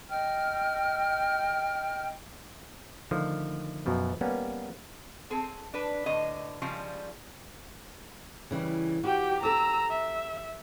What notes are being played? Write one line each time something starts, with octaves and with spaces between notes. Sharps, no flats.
D#5 G5 F6
D3 D#3 F3 A3
F#2 B2 F3
G3 A#3 B3 C#4
C4 G#4 A4
D4 B4
A2 D3 D#5
C#3 F3 G3 G#3
C#3 E3 G3
F#4 G4 G5
C4 G4 A4 A#5 E6
E5